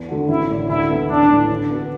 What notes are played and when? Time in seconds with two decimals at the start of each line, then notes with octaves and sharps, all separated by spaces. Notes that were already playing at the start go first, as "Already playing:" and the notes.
Already playing: E2
0.09 D3 A3 F#4
0.29 A1 E4
0.49 A2 A3 E4 D5
0.69 D2 E4
0.90 D3 B3
1.10 A1 D4
1.30 A2 E3
1.50 D3
1.70 B3 F#4 B4